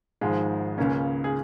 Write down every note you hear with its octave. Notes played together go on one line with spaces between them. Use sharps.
G#1 G#2 F3 G#3
C#2 C#3 A#3 C#4
G#4